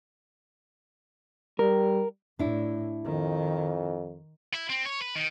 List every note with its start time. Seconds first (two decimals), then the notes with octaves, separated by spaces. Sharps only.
1.59 G3 A#4
2.39 A2 D4 E4
3.05 F2 D#3
4.54 E4
4.70 C4
4.85 C#5
5.02 B4
5.16 D#3